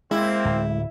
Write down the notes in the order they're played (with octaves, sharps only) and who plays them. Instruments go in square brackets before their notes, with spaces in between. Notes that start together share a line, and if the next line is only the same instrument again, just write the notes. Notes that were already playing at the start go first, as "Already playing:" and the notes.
[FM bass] G#3 [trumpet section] A#3 C4 [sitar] E4
[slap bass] D1